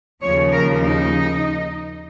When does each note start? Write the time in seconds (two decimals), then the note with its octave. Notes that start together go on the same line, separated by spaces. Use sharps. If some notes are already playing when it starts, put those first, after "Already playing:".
0.21 D#2 C#3 F3 C#5
0.52 A#4
0.81 D#4